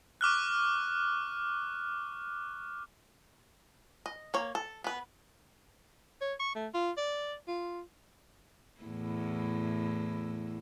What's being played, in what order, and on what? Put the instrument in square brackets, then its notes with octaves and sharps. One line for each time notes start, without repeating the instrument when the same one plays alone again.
[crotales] C#6 D6 F6 F#6
[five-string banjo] D#5
A#3 C#5
A4
B3 B4
[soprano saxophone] C#5
C#6
A3
F4
D5
F4
[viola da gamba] E2 A2 E4